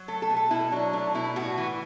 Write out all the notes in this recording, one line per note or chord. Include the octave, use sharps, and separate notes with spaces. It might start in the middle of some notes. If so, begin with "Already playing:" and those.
Already playing: F#3
A3 A4
A4
B2
A4
B2 E4
F#3 D4
A3 D4
B2 E4
A2 F#4
E3